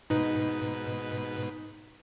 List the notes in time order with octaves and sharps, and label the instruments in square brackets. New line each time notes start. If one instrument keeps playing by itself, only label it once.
[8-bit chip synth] G#2 B2 B4 [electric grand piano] D#4